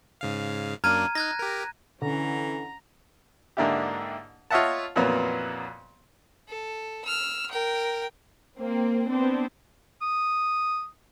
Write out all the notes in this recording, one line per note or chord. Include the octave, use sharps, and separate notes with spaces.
G#2 C#3 F5
F#2 A#3 D4 A#5 F6 G#6 D#7
D#4 F#6 G#6 A#6
G4 A#4
D3 E3 C#4 A#5
G#2 D3 A#3 D4 E4 G4
F4 C#5 D#5 E5 F#5 A5
F2 A#2 E3 F#3 A#3 B3
A4
E6 F6
A#4 G5
A#3 C4
B3 C4 D4
D#6